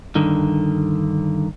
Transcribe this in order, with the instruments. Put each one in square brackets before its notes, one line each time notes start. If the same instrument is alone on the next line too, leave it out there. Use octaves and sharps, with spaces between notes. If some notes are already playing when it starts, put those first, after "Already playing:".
[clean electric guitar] G2 D3 D#3